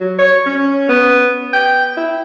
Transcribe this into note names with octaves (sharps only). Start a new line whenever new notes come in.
F#3
C#5
C#4
B3
G5
E4